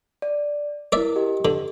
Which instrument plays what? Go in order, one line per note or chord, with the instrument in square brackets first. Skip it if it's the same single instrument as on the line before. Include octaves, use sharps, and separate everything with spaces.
[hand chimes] D5
[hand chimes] E4 A#4 [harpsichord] D5 E5
[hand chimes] G4 D#5
[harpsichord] D3